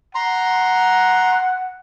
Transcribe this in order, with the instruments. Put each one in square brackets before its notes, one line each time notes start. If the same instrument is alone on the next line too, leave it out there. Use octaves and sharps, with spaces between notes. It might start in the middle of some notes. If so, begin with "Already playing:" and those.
[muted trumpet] F#5 [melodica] A#5 C6